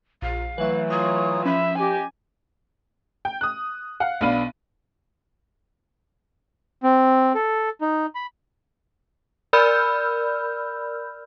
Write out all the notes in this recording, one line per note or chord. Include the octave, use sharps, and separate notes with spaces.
A#1 F5
E3 F#3 A3 B4 F#5
F4 C#5 A#5 D#6 G#6
F3 C#4 E5 B5
G4 D#5 G#5
G5
D#6 F#6
F5 F#5
B1 B3 D4 F5 B5 D#7
C4
A4
D#4
B5
A#4 D5 B5 E6 F6 G6